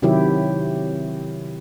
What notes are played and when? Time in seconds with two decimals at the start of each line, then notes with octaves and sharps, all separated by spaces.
0.02 C3 D#3 F#3 E4 G4